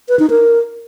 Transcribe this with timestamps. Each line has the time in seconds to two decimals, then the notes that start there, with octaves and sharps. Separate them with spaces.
0.09 B4
0.19 D#4
0.30 A#4